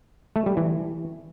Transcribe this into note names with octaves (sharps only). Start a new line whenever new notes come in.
A3
G3
E3